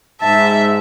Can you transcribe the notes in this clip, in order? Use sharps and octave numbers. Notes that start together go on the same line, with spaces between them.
G#2 E5 A5